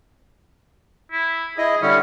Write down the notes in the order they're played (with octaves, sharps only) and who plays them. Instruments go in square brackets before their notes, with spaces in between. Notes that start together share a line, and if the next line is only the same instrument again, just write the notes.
[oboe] E4
[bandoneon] E4 D#5 [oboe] G#4
[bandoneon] D3 G3 E4 [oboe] C#4